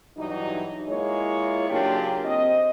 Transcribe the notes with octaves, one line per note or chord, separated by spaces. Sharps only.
G2 E3 F#3 D#4
G#3 A#3 E4 F4 C#5
C#3 F#3 A#3 D4 F4 G4
C4 D#5